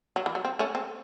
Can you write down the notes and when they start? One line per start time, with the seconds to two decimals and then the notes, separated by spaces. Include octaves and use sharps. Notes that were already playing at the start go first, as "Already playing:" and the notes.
0.16 F#3
0.26 E3
0.35 F#3
0.45 C4
0.59 A3 C#4
0.75 C4